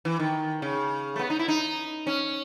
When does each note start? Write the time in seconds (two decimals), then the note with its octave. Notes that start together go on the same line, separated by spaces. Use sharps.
0.05 E3
0.19 D#3
0.62 C#3
1.16 A3
1.19 B3
1.30 D#4
1.39 E4
1.48 D#4
2.07 C#4